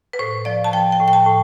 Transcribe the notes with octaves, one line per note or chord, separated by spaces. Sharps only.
B4
A2 C5
F3 D5
A5
F3 G5
G5
A2
G5
A5
A2